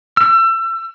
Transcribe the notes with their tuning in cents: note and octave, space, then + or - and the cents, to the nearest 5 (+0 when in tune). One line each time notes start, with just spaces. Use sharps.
E6 +30